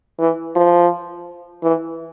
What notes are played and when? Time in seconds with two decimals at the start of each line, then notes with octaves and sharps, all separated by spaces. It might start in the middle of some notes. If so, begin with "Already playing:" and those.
0.19 E3
0.56 F3
1.63 E3